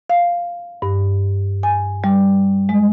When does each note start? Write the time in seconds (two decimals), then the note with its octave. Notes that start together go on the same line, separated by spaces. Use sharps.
0.10 F5
0.82 G2
1.63 G#5
2.04 G3
2.69 G#3